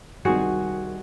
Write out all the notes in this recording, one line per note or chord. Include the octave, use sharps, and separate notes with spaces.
C2 D#3 F#4 G#4 C5 C#7